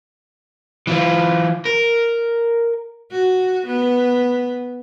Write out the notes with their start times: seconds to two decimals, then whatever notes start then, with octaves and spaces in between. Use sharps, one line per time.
0.87 E3 F4
1.65 A#4
3.11 F#4
3.67 B3